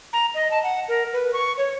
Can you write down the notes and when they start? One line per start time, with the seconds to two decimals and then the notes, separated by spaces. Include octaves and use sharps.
0.13 A#5
0.35 D#5
0.51 A5
0.63 F#5
0.88 A#4
1.13 B4
1.33 C#6
1.57 C#5